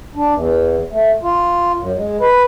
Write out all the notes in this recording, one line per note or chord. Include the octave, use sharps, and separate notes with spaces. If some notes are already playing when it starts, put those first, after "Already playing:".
D4
E2
A3
F4
F#2
G#3
B4